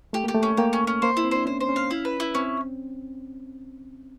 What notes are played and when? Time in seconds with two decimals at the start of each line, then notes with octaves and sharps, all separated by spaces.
0.13 A3 G4
0.24 A#3 G4
0.34 A3
0.43 C#4
0.57 A#3 G4
0.73 C#4
0.87 C#4
1.02 A#3 C5
1.17 E4
1.24 C4
1.31 D4 C5
1.46 C#4 C5
1.60 C5
1.69 C#4
1.76 F5
1.91 E4
2.05 B4
2.20 E4
2.35 C4 C#4